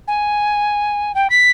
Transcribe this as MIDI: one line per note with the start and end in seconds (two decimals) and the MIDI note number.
0.08 1.12 80
1.15 1.27 79
1.30 1.51 95